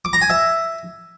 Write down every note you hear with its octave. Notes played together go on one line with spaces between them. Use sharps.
D6
A#5
G#5
E5